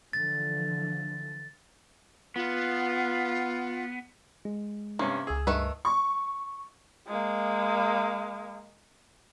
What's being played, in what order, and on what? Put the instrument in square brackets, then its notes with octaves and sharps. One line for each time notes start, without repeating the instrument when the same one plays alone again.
[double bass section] D3 E3 F3 [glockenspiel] A6
[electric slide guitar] B3 [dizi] F4
[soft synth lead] G#3
[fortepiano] G2 C3 C#4 [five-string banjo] A#3
[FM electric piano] C#2 E6 [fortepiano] G#4
[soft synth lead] G2 [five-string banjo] D#3 A3 B4
[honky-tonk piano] C#6
[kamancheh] G#3 A#3